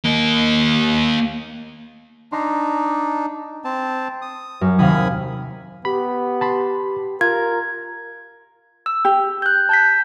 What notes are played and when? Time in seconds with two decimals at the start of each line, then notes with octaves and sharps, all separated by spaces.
0.04 A#3 D#5
2.32 D4 D#4 A#5 C6
3.64 C4 A5
4.22 D#6
4.61 F#2
4.79 D#2 C3 F5 G#5 B5 D#6
5.85 B3 G4 B5
6.41 A5 B5 C6
7.21 F4 A#4 G#6
8.86 E6
9.05 G4
9.42 F#6 G6
9.69 A5 G6 B6